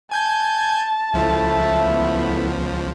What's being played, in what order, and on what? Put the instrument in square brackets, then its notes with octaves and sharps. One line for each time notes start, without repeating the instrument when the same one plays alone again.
[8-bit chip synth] G#5 G6 G#6 [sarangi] A5
[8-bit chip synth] C#2 F3 [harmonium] A3 E4 E5
[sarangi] B3